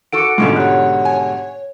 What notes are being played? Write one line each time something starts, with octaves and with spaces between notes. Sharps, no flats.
F#4 A4 F#5 D6 D7
G#2 B2 D3 G#3 C#4 F4
G4 C#5 F#5 F#6
G#5